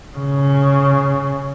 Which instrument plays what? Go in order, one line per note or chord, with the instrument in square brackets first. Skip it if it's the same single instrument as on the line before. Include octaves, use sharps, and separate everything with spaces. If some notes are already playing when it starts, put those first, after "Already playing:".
[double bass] C#3